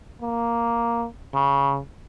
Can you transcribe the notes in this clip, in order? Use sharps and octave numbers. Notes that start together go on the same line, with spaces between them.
A#3
C#3